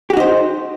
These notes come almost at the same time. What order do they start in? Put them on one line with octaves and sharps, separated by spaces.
G4 F#4 D#4 C5